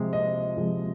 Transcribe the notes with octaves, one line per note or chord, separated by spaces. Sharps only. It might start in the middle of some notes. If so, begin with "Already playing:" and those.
Already playing: C3 F3 G#3
D#5
C3 F3 G#3